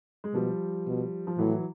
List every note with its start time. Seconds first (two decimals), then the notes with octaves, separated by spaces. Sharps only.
0.24 G#3
0.34 B2 F3 G3
0.87 B2
1.27 F3
1.38 A2 E3 F#3